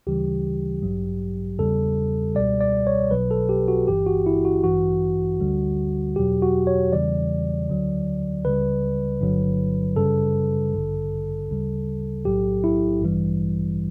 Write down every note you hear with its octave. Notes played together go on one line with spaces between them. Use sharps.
D2 C#3 E3 G3 G4
A1 G2 F#3
E2 C#3 G3 A4
C#2 B2 G3 D5
D5
C#5
B1 B2 F#3 B4
A4
G4
F#4
G1 G2 E3 G4
F#4
E4
F#4
A1 G2 E3 F#4
D2 D3 G3
E2 B2 F#3 G4
F#4
C#5
E2 C#3 E3 G3 D5
D2 D3 F#3
C#2 C#3 G3 B4
G1 G2 D3 F#3
F#2 C#3 G3 A4
A1 G2 D3
D2 C#3 G3
B1 A2 F#3 G4
E4
A1 G2 E3 G3